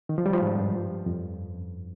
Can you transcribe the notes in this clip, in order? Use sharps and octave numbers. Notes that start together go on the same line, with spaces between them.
D#3
F3
G3
F3
G#2
G2
F2